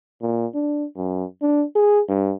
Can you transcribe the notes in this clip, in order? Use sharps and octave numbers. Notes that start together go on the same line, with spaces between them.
A#2
D4
F#2
D4
G#4
G2